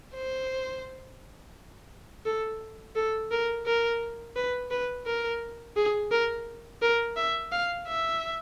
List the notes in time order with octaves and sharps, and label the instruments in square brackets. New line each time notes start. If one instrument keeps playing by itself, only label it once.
[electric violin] C5
A4
A4
A#4
A#4
B4
B4
A#4
G#4
A#4
A#4
E5
F5
E5